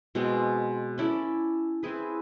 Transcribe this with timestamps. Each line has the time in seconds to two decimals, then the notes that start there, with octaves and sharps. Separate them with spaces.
0.15 B2 G#3 C4
0.98 C#4 E4 A4 D5
1.83 C4 E4 G#4 B4